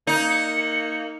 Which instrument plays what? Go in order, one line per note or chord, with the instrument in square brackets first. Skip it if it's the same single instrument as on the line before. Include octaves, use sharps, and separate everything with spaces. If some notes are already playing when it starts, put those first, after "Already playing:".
[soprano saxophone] A#3 [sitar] D#4 [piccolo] C#7